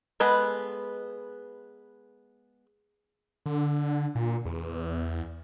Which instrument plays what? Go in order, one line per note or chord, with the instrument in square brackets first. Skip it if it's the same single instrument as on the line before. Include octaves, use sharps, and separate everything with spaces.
[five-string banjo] G#3 B3 A4 B4 B5
[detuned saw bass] D3
A#2
E2